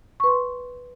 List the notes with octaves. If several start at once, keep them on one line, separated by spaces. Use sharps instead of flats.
B4 C6 C#6